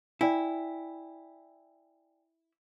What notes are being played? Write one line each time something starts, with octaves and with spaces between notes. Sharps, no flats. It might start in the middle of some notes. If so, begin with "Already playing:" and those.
E4 D5 G5 G#5